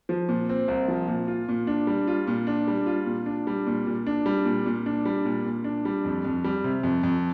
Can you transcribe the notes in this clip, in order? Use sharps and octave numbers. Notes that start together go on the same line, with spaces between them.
F3
A#2
C4
C2
F3
A#2
F4
A#2
D4
G3
F4
A#2
D4
G3
F4
A#2
D4
G3
A#2
A#2
D4
G3
A#2
A#2
D4
G3
A#2
A#2
D4
G3
F2
F2
G3
C3
F2
F2